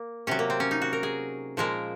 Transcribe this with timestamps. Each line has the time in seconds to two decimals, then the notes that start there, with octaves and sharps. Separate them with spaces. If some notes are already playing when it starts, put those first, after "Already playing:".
Already playing: A#3
0.27 C3 F#3 C#4
0.39 A#3
0.50 C4
0.60 C#4
0.71 D#4
0.82 F#4
0.93 A#4
1.03 G#4
1.57 A#2 F3 G#3 A#4